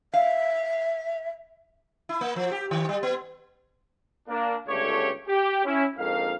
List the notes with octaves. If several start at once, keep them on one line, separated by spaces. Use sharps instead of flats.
E5 F5
E4
A#3
F3
G4
D#3
G3
B3
A#3 D4
G1 C#2 D3 A3 G4 C#5
G4
C#4 E4
A#1 F2 G#2 A#4 F5